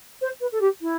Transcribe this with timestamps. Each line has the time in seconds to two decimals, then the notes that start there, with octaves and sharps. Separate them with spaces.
0.21 C5
0.41 B4
0.52 A4
0.61 G4
0.82 E4